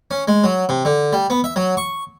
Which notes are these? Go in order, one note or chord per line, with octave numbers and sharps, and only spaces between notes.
C#4
G#3
F#3
C3
D3
G3
B3
E5
F#3
C#6